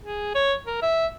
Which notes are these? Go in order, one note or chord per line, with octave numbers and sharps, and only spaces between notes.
G#4
C#5
A#4
E5